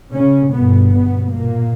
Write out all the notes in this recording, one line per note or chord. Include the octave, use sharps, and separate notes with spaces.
C#3 C#4
G1 G2 B2 B3
B2 B3
A#2 A#3